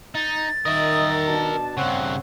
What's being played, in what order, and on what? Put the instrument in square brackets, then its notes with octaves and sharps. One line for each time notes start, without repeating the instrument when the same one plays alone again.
[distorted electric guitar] D#4 [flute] A6
[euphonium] D#3 [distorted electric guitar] A#4 E5 [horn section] D#5
[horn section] B2 D4 A5
[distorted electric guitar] G2 C#3 [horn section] C4 C#5 F#5